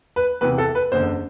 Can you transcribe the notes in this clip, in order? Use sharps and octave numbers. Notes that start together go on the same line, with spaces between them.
B4
E2 C3 E3 B4
A4
B4
F#1 E2 D3 C5